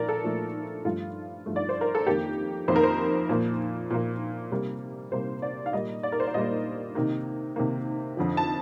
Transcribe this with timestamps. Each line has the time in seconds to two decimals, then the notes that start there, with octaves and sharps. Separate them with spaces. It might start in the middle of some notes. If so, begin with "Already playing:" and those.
Already playing: A#2 F3 A#4 D5
0.09 A4
0.24 A#2 F3 A3
0.85 G2 F3 A3 F4
1.46 G2 F3 A3
1.56 D5
1.69 C5
1.81 A#4
1.95 A4
2.07 F2 D#3 A#3 G4
2.68 F2 D#3 A#3 C5
2.76 A#4
2.83 C5
3.29 A#2 F3 A#3
3.90 A#2 F3 A#3
4.51 C3 G3 A#3
5.12 C3 G3 A#3 C5
5.42 D5
5.66 F5
5.73 A#2 G3 A#3 D#5
6.03 D5
6.12 A#4
6.20 C5
6.27 D5
6.34 A#2 G3 A#3 D#5
6.95 C3 D#3 A#3
7.56 C3 D#3 A#3
8.17 F2 D3 F3
8.37 A5